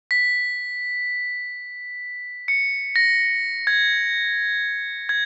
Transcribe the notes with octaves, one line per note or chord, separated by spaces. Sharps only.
B6
C#7
A#6
G#6
G#6